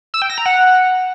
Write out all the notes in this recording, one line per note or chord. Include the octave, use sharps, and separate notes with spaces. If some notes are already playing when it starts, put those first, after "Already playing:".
E6
G5
A#6
A#5
F#5